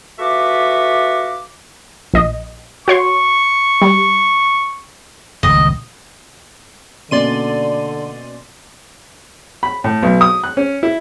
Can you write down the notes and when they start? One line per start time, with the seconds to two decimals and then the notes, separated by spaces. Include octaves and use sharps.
0.19 A3 F4 F#4 B4 E5 D6
2.14 A#1 D#5
2.88 F#4 C#5 C6 C#6
3.82 G3
5.43 D#1 C#2 D#5
7.11 B2 D3 A#3 C#4 D5 C6 D#7
9.63 B5
9.84 A2
10.03 B1
10.21 D#6
10.44 F#6
10.57 C#4
10.83 E4